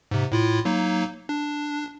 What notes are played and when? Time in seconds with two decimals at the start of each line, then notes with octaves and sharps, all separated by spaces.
0.11 G#2 C3
0.32 A2 E4 F4
0.65 F#3 A#3 D#4
1.29 D4